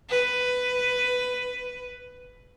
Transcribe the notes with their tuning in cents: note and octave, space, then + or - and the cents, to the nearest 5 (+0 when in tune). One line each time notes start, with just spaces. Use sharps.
B4 +10